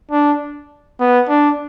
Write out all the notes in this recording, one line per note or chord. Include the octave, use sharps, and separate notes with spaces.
D4
B3
D4